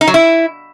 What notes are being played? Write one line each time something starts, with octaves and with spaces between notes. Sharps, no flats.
D#4
F#3
E4